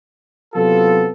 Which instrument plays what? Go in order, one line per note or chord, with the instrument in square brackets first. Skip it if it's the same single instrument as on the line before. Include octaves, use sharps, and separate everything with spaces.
[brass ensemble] C3 F#3 B3 F4 A4